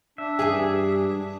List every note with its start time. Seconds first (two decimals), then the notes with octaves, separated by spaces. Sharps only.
0.18 D4 E5
0.39 G2 E3 G3 G#4